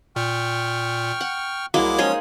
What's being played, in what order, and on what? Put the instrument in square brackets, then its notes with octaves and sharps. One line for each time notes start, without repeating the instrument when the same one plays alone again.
[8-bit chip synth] A#2 [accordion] G5 C#6 F6
[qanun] F#5
[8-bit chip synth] C2 E4 D6 [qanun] F#3 G#3 A#3
[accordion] F3 G#3 C#4 [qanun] D#4 G#4 C5 [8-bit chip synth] C#5